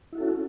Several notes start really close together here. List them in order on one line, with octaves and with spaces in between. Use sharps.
E4 F#4 A4 C#4